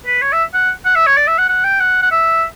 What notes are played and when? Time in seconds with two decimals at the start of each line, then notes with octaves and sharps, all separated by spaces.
0.06 B4
0.22 C#5
0.33 E5
0.54 F#5
0.85 F#5
0.96 E5
1.06 C#5
1.17 D5
1.28 E5
1.38 F#5
1.49 F#5
1.64 G5
1.80 F#5
2.02 F#5
2.11 E5